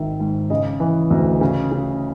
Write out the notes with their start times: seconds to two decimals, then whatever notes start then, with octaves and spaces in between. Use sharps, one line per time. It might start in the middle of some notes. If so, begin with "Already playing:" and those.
Already playing: G#1 D#3 E5
0.20 G#2
0.50 C#3 D#5
0.80 E3
1.10 D2
1.41 C#3
1.72 C#3